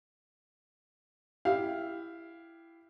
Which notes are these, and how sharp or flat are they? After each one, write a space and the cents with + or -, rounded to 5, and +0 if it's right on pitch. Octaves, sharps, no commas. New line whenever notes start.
E4 +15 G4 +0 F5 +0